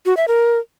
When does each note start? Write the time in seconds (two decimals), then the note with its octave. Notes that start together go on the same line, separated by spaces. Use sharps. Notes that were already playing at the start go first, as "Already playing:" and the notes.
0.06 F#4
0.17 E5
0.28 A#4